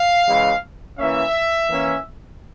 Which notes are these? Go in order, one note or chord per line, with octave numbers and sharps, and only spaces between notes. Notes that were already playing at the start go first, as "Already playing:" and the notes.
Already playing: F5
C#3 E3 G#3
E3 A#3 C#4 E5
E3 A#3 C#4